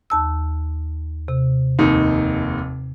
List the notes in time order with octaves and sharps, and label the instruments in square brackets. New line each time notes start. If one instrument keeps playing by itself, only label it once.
[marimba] D#2 A5 E6
C3
[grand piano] F1 D#2 D#4